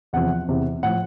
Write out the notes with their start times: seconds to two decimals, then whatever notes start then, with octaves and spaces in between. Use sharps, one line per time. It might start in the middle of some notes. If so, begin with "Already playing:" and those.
0.13 E2 C3 F3 F#5
0.48 E2 C3 E3
0.83 A2 F3 F#5